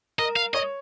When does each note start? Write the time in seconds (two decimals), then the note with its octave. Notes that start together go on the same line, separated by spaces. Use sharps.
0.18 A#4 D#5
0.36 F5
0.54 C#5 D#5